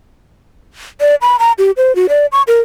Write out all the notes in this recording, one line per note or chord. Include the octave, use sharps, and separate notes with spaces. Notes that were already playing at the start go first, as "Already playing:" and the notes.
D5
B5
A#5
G4
C5
F#4
D5
C#6
A#4